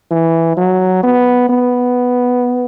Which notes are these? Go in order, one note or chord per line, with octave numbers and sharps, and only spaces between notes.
E3
F#3
B3
B3